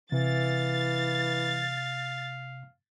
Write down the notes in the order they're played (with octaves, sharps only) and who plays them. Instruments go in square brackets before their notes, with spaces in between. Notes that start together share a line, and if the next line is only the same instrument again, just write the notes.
[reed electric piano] C3 [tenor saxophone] E3 [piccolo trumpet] F5 [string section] A6